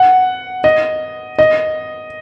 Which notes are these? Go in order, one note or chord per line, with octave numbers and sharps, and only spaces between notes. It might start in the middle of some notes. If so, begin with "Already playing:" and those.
Already playing: F#5
D#5
D#5